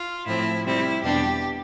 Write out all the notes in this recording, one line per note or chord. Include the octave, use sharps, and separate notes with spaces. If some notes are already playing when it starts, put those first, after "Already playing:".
Already playing: F4
A2 F3 C4 E4
C3 G3 C4 E4
E2 B2 G3 D4 G4